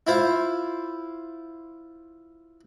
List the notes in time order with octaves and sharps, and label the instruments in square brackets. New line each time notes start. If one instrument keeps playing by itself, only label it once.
[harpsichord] E4 F4 C5